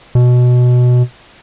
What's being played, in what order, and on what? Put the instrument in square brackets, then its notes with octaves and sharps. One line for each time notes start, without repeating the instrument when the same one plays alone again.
[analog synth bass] B2